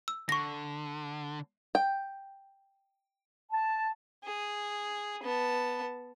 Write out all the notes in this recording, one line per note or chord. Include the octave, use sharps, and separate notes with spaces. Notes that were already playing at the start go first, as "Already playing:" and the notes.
E6
D3 C#6 A#6
G5
A5
G#4
B3 A5